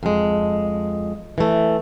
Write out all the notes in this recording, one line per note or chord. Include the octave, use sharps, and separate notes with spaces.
F2 G#3
E3 A3